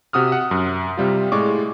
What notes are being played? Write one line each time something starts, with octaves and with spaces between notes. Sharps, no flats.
C3 F#4 D#6 F6
F#5
F#2
C3 G3 F4
A2 G#3 D5 C#6 D6